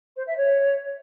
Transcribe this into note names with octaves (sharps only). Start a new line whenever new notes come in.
C5
E5
C#5